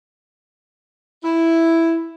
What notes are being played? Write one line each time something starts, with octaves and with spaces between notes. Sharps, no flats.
E4